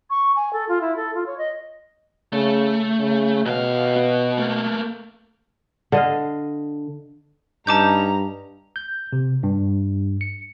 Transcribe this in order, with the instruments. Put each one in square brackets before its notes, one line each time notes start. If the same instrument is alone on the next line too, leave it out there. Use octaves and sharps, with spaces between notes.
[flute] C#6
G#5
A4
F4
E4
A4
F4
C#5
D#5
[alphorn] C#3 [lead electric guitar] A3
[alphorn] C#3
[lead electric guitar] D#2 F5 [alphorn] B2
[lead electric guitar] B3 F#4
A3 A#3
[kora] D3 D#5 F5
[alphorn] G2 [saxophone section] C#4 D#4 [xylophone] A5 D6 G6 [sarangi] A#5
[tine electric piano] G6
C3
G2
C#7